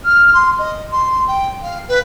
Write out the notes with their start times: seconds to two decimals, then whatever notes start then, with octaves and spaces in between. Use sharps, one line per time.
0.04 F6
0.33 C6
0.58 D#5
0.91 C6
1.27 G5
1.62 F5
1.88 B4